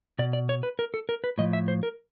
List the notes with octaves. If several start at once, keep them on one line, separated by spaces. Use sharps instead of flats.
B2 D5
D5
C#5
B4
A#4
A4
A#4
B4
A2 F3 D#5
E5
C5
A#4